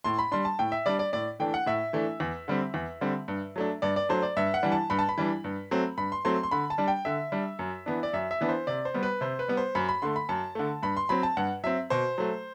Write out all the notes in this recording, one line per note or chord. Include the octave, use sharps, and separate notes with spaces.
A2 C6
B5
G3 D4 C6
A5
A2 G5
E5
G3 D4 D5
D5
A2 D5
E3 A3 D4 G5
F#5
A2 E5
E3 A3 D4
E2
D3 G3 C4
E2
D3 G3 C4
G2
F#3 A3 D4
G2 D5
D5
F#3 A3 D4 C5
D5
G2 E5
F#5
E3 G3 D4
A5
G2 B5
A5
B5
E3 G3 D4
G2
F#3 A3 C4
G2 B5
C6
F#3 A3 C4 C6
C6
D3 B5
A5
G3 D4
G5
D3 E5
G3 D4
F#2
E3 B3 D4
D5
F#2 E5
E5
E3 B3 D4
C5
C3 D5
C5
G3 B3
B4
C3 C5
B4
G3 B3
C5
F#2 B5
B5
D3 A3 C6
B5
F#2 A5
D3 A3
G2 B5
C6
F#3 C4 B5
A5
G2 F#5
F#3 C4 E5
B2 C5
F#3 A3